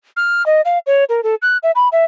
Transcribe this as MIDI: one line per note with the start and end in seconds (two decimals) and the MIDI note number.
0.17 0.45 89
0.46 0.61 75
0.65 0.78 77
0.87 1.04 73
1.09 1.21 70
1.24 1.35 69
1.42 1.57 90
1.63 1.71 76
1.75 1.89 83
1.92 2.05 76